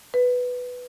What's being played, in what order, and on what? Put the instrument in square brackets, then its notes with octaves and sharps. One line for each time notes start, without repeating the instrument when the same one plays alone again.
[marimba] B4